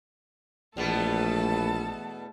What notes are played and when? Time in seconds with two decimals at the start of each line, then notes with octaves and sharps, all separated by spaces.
0.77 A#1 E2 B2 A3 B3 A4 A5